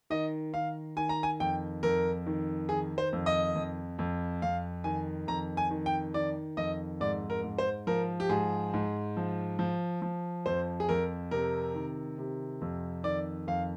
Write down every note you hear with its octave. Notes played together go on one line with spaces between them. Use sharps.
D#3 D#5
D#3 F5
D#3 G#5
A#5
G#5
F2 G5
F2 A#4
D#3
D#3 G#4
C5
F2
D#5
F2
F2
F2 F5
D#3 G#5
F2 A#5
G#5
D#3
G5
D#3 D5
F2 D#5
G#2 D5
A#4
G#2
C5
F3 A#4
G4
G#2 G#4
G#2
F3
F3
F3
F2 C5
G#4
F2 A#4
C3 A#4
D#3
C3
F2
D#3 D5
F2 F5